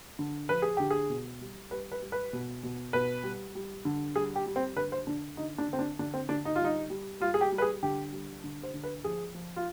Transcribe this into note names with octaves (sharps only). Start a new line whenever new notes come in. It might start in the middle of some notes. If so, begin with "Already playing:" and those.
D3
F3 B4
G#4
D3 G4
G#4
B2
G3
G3 B4
B4
G3
B4
B2
B2
B2 B4
G3
G3
D3
G3 G#4
G4
G3
C4
D3 B4
C5
D3 D4
D3 D#4
D4
D3 C4
D4
D3 D4
C4
D3 D4
D#4
F4
G3 D#4
G3
G3 F4
G#4
G4
G3
B4
G#4
D3 G4
G3
D3
C5
D3
B4
F3 G#4
F3
F4